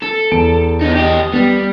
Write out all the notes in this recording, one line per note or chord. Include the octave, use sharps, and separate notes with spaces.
A4
E2 A5 D7
B3 D#4
G4 D#5
G3 B3